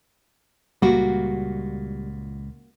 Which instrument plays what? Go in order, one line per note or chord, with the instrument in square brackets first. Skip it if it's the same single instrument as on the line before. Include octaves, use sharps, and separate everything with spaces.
[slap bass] C#2 A#2 [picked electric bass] G3 [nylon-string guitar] A#3 F#4